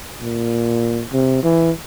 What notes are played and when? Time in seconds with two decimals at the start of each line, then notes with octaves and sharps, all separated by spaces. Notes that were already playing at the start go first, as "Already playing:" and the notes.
0.21 A#2
1.12 C3
1.43 E3